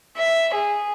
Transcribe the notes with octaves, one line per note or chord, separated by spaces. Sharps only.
E5
G#4